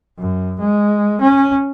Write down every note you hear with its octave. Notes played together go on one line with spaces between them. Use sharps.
F#2
G#3
C#4